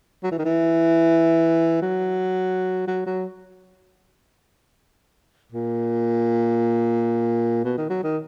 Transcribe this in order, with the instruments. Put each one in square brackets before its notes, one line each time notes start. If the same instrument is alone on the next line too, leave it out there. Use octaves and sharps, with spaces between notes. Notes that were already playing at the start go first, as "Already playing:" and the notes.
[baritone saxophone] F#3
E3
D#3
E3
F#3
F#3
F#3
A#2
B2
D#3
F#3
D#3